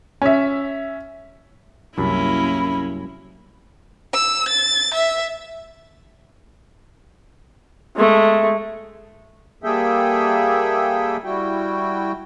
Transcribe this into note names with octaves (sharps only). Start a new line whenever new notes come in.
C#4 E5
C2 F#2 A#3 C#4 E4 B5
E6
A6
E5
G#3 A3
G3 A#3 G#4 A4 E5 G5
G3 E4 F#4 G5